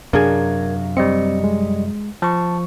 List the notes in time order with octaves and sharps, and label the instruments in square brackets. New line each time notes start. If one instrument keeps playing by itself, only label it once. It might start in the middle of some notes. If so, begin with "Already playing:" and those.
[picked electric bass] F#2 C3 F#3 [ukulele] D4 G#4 [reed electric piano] A#4 G#6 [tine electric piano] F5
[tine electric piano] G3 D#5 C#7 [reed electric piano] C4
[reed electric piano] G#3
[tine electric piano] F3 C#6 [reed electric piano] A5